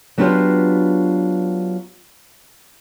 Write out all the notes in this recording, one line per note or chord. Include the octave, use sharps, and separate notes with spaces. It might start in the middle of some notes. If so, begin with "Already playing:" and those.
F#3 B3 D4 F4 G4 B4